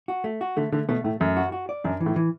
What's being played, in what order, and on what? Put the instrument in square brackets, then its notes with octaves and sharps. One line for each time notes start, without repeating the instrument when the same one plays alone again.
[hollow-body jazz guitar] F#4
A3
F#4
[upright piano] D3 [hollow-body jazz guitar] A3
[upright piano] D3 [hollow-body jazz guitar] A3
[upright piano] B2 [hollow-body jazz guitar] A3
[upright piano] A2 [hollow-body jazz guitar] A3
[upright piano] F#2 [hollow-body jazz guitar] A3
[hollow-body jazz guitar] F#4
F#4
D5
[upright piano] F#2 [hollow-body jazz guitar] D4
[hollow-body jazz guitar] E3
[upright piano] A2
[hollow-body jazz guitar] E3